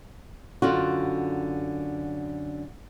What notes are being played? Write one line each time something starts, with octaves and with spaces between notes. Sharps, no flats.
F#2 D3 F4 F#4